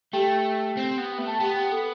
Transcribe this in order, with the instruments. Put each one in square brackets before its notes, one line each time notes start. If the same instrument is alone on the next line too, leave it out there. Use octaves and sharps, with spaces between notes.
[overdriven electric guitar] A3 [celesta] G4 G5
[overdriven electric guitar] C4
B3
A3
[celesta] A5
[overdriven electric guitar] B3 [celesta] G4 G5
[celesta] G4 G5
A4